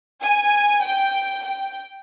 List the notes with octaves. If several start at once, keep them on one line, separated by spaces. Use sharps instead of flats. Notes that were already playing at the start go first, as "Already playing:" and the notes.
G#5
G5
G5